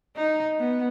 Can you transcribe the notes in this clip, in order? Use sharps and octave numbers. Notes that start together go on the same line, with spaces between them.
D#4
B3